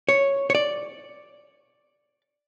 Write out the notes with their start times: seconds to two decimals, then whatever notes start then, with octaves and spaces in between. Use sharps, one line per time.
0.09 C#5
0.50 C#5
0.55 D5